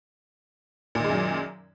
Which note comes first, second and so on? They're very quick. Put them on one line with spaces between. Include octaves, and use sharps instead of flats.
A#2 D#3 G#3 F#2 F#3